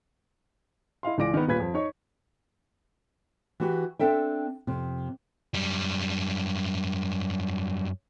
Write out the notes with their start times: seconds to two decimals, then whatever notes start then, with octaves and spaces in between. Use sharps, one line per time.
1.03 E4 D#5 F5 C6
1.18 C#2 E3 D5 D6 A#6 D7
1.34 D#3 B3
1.47 D#1 A#2 B4 G#6 B6
1.60 F2
1.74 D#4 C#5 C#6
3.60 E3 F#4 G4
3.99 C4 D4 A4 E5 G5
4.67 F2 C3
5.54 F#2 G3